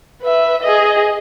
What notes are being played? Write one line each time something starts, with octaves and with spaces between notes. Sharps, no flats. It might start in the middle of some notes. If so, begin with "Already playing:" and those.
B4 E5
G#4 D#5